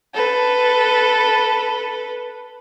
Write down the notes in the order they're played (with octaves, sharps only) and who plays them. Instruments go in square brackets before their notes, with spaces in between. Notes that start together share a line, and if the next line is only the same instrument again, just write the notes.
[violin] A4 B4